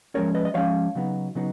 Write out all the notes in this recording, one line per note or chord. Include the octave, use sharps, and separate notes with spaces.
F3 G#3 C#4 A#4 C#5
B4 D#5
D#5
F3 G#3 C#4 C#5 F5
C#3 F#3 B3 D#4
C#3 F#3 B3 D#4